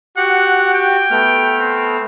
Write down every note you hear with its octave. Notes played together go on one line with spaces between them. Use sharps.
F#4 G4 F#5
G5
A3 B3 F6
C4